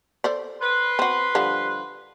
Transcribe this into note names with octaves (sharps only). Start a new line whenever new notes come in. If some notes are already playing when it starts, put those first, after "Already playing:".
A4 C5 D5
B4 C6
C4 F#4
D3 F3 G3